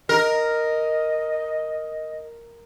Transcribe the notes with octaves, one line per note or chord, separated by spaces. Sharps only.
A#4 D#5